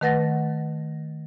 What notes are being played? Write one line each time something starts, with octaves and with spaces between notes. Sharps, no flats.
D#3 A3 B4 F#5 A6 A#6